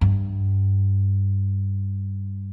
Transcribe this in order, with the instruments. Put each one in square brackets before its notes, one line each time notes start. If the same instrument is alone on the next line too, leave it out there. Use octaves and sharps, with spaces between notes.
[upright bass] G2